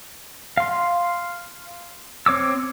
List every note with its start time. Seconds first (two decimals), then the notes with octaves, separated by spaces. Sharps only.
0.57 F5 C6
2.26 C4 C#5 D6 E6